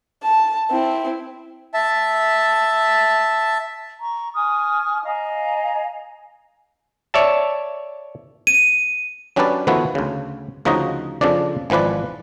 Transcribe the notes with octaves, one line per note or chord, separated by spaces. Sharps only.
A5
C4 E4
E5 A5
A#5 C#6
G#5 C#6 D#6 F6
D#5 F5 G#5 A#5
C#5 D5 E5 A5
D#7
F#3 C#4 D4 G4 B4 D5
D#3 F3 A3 B3 E4 F#4
D2 C#3
D2 C#3 F3 D#4 F#4 D#5
F2 C#3 F3 D4 D5
G#1 E3 F3 B4 D5